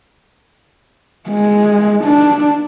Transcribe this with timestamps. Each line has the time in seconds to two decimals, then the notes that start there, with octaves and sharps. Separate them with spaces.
1.30 G#3
2.04 D4